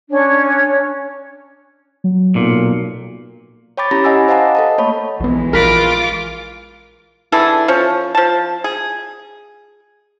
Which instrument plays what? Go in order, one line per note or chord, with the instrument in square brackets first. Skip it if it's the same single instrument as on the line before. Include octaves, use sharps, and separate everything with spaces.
[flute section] C#4 D4 C#5
[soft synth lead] F#3
[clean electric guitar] B1 A#2
[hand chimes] C#5 G5 B5 D6 A6
C#4 E4 G4 A#5 B5 A#6
D#5 F#5 G#5 D6 E6
C5 D#5 F5 F#5 A5 A#5
A4 D#5 A5
A3 A#3 C#5 B5
[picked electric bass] A#1 B3 [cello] E3 G#3
[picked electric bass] A#1 [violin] F4 D6 [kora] A#4 B4
[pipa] D3 E3 G#4 A4
F3 C#4
F3 A5
G#4